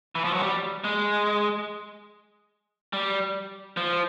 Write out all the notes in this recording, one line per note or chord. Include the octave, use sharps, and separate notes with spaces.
E3
F3
F#3
G3
G#3
G3
F3